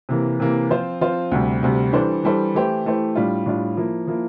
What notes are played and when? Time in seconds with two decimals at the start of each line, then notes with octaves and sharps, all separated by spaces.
0.09 C3 E3 A#3
0.40 C3 E3 A#3
0.70 F3 C4 F4 C5
1.01 F3 C4 F4 C5
1.32 D2 C3 G3
1.63 D2 C3 G3
1.92 E3 G3 D4 A4 C5
2.23 E3 G3 D4 A4 C5
2.54 E3 A3 E4 G4 C5
2.85 E3 A3 E4 G4 C5
3.15 A2 G3 D4 F4
3.46 A2 G3 D4 F4
3.77 F3 A#3 E4
4.07 F3 A#3 E4